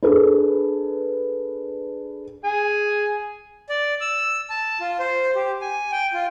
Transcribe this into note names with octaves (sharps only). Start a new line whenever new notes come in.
D4 G#4 A4 B4
G#4 G#5
D5
E6
A5
F4
C5
G4
G#5
G5
F4